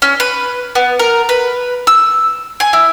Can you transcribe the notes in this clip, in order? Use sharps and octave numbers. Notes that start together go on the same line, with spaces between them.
C#4
B4
B3
A#4
B4
E6
G#5
E4